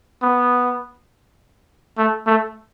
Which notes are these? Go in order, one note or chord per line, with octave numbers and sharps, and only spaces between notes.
B3
A3
A3